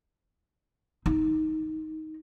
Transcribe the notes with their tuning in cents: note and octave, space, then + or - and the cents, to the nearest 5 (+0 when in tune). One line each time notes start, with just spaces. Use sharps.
D#4 +10